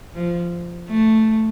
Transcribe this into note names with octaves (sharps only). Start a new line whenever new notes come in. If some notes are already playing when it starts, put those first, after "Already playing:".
F3
A3